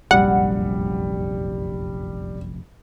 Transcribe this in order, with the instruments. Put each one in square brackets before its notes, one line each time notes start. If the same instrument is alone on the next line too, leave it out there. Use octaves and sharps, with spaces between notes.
[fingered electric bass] F1 A#1 F#2 [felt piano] G3 [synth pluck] F#5